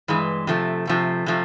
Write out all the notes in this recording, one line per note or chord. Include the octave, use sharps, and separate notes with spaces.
G2 E3 G#3
C3 F3 A3
C3 F3 A3
C3 F3 A3